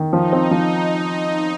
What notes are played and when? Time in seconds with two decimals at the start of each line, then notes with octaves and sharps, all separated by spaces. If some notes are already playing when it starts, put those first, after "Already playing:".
Already playing: D#3
0.12 F3 D#4
0.33 C4
0.51 F3